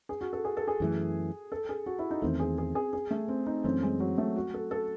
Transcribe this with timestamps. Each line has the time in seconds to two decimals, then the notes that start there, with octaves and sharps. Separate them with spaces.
0.09 G#4
0.21 F#4
0.33 A4
0.45 G#4
0.57 A4
0.68 G#4
0.80 F#2 E3 A3
1.52 A4
1.69 G#4
1.86 F#4
1.99 E4
2.11 D#4
2.22 E2 D#3 A3 C4
2.40 G#4
2.58 G#4
2.75 G#4
2.93 G#4
3.11 A3
3.28 C4
3.47 D#4
3.64 F#2 E3 A3 C4 C#4
3.83 G#3
4.00 F#3
4.18 A3
4.36 F#4
4.54 A4
4.71 A4